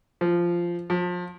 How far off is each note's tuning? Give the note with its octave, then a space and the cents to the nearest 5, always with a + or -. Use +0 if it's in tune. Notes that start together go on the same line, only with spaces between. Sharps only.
F3 -10
F3 +30